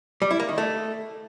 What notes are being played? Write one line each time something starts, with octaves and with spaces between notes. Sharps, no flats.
G3
E4
A#3
D#3
A3